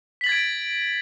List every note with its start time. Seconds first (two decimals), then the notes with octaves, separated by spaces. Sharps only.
0.21 B6
0.24 F#7
0.26 A6
0.29 G#6
0.32 D7